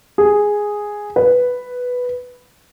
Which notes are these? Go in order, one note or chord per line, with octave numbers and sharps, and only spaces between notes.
G#4
B4